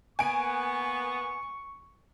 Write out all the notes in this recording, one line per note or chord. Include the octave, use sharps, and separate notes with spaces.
A#3 B3 G#5 C#6 D7